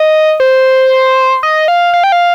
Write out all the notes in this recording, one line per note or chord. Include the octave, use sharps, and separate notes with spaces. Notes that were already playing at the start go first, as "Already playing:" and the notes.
Already playing: D#5
C5
D#5
F5
F5
G5
F5